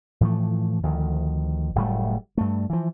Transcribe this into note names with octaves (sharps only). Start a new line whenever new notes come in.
A2 E3 F3 A3
D2 D#3 F3
F#1 A2 G3 A3
G2 A3
E3 F3